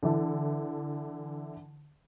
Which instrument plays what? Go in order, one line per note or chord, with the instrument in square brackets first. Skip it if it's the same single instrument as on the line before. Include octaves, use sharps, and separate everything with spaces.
[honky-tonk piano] D3 E3 E4 A4